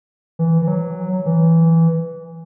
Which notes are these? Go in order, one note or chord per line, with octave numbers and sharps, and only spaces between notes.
E3
E3
F#3
E3